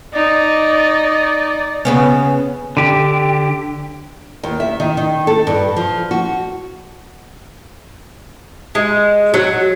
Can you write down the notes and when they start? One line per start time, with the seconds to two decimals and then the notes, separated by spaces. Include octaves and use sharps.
0.14 D#4 D5
1.85 C#3 B3 C#4
2.77 D3 G4
4.43 D#2
4.60 E5
4.80 D#3
4.97 D#3
5.27 A4
5.47 G2
5.76 F3
6.11 F#4
8.75 G#3
9.34 F#3